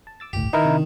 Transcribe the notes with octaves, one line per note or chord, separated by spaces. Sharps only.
A5
D6 E6 A6
G1 C#2 A2 G4
D#3 D#4 E4 A#4 B4
C3 D4